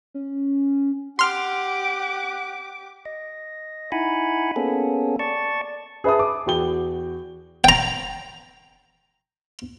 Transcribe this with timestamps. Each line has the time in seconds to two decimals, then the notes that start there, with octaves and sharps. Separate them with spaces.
0.14 C#4
1.19 G4 F#5 C6 D6 F6
3.05 D#5
3.92 D#4 E4 F#5 G#5 B5
4.56 A#3 B3 C#4 G#4 A4
5.19 D5 A5 C#6
6.04 G#4 B4 E5 A5 D#6
6.19 D6
6.46 E2 F#4 G5 G7
7.64 G5 A#5